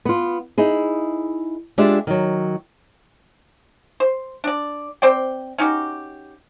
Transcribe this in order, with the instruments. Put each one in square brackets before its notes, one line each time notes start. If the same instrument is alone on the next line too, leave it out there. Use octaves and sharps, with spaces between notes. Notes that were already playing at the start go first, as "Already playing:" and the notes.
[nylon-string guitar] B3 F4
D#4 E4 G#4
G#3 D4 F4 G4 E5
D#3 F#3
[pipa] C5
D4 D5
C4 C5 D5 G5
C#4 D#4 F#4 G4